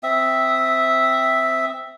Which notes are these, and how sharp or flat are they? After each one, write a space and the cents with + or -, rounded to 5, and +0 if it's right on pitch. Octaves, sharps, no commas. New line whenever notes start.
C4 +0 E5 +0 D#6 +0